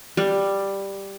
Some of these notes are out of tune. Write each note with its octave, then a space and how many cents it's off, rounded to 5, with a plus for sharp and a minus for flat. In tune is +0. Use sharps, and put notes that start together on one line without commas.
G3 +5